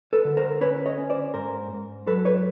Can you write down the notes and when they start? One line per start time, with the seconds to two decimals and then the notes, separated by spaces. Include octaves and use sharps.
0.13 A4 B4
0.25 D3
0.37 A#4 C5
0.61 C#4 B4 C#5
0.86 C#5 D#5
0.98 C#4
1.10 C5 D5
1.34 G#2 A#4 C5
1.71 G#2
2.07 F#3 A4 B4
2.25 B4 C#5